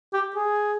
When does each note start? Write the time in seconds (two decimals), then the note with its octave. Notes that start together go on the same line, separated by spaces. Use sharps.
0.14 G4
0.35 G#4